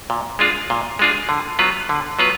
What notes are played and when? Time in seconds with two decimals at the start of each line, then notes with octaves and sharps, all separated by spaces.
0.10 A#2
0.39 G#3 D4 F4 G#4
0.70 A#2
0.99 G#3 D4 F4 G#4
1.29 D3
1.59 F#3 B3 F4 B4
1.89 D3
2.19 F#3 B3 F4 B4